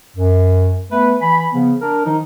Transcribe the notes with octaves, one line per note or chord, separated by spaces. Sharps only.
F#2
A3 B3 B4
E3 G#5 B5
C#3 F3 B3
D4 A#4
D#3 F3 D#4